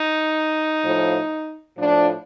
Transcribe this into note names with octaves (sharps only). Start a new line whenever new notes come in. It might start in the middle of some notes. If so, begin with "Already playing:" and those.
Already playing: D#4
A2 F3
A2 F3 D4